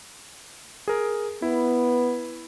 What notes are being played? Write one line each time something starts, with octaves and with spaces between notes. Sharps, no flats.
G#4 A#4
B3 E4